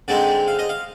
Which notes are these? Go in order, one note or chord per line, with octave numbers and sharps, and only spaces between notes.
D3 G#3 C4 D#4 D5
F5
D#5
F5